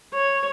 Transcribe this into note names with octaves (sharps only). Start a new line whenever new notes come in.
C#5